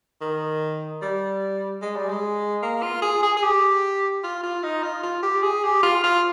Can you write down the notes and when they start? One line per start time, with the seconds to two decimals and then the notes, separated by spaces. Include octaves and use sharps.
0.22 D#3
1.02 G3
1.82 G#3
1.96 G3
2.09 G#3
2.63 A#3
2.82 F4
3.02 G#4
3.23 G#4
3.37 G#4
3.43 G4
4.23 F4
4.43 F4
4.63 D#4
4.83 F4
5.03 F4
5.23 G4
5.43 G#4
5.63 G4
5.83 F4
6.03 F4